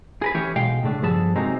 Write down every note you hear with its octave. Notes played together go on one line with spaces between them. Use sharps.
G#4 A#4 B4
E3 A3 C#4 G4 C#5
B1 B2 G#3 F5 G5
A2 C#3 A3 D4
G2 F3 B3 G#4 A4 A5
C3 F#3 G#3 A#3 C4 D#4